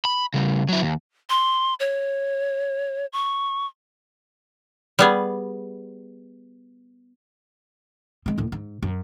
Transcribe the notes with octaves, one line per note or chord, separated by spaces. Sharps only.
B5
C#3 G3
F#3 E4
D#2
C6
C#5
C#6
G3 B3 G#4
G#3 C4
D#2 A2
G#2
F#2